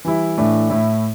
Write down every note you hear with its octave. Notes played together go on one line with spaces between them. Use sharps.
E3 G3 E4
A2 E3 A3 D4
A2 A3 E4